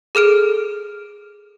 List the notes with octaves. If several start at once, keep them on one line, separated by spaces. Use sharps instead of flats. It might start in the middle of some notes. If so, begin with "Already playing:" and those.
G#4 A4 F6 D7